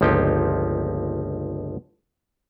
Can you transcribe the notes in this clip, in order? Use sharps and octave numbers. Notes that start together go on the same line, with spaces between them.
G1 C#2 F3 A#3 D#4 G4